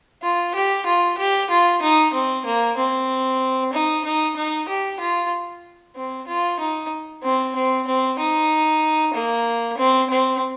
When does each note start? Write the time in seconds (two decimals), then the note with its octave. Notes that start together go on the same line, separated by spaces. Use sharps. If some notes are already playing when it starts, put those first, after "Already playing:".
0.22 F4
0.54 G4
0.86 F4
1.18 G4
1.50 F4
1.82 D#4
2.14 C4
2.45 A#3
2.77 C4
3.74 D#4
4.05 D#4
4.36 D#4
4.68 G4
5.00 F4
5.96 C4
6.28 F4
6.59 D#4
7.23 C4
7.55 C4
7.87 C4
8.18 D#4
9.14 A#3
9.77 C4
10.10 C4